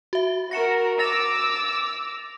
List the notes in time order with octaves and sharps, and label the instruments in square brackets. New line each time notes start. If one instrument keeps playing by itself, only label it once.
[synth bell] F#4 E5
[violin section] F#4 A#4 [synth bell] A#6 C#7 E7
[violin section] D6 E6 [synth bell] A6 A#6 F7